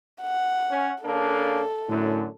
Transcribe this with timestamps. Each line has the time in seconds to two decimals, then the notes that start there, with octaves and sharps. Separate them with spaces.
0.22 F#5
0.71 C#4
1.04 C#3 A#3 D4 A4
1.89 F#2 A2 D3